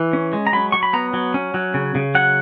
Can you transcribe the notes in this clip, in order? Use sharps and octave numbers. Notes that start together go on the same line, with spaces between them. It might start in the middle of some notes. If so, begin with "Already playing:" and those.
Already playing: E3
C#4
G#3
A#5
F#3 B5
F#3 C#6
B5
B3 A#5
F#3
C#4
F#3
C#3
C#3
F#3 F#5